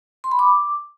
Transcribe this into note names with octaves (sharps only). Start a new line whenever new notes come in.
C6
B5
D6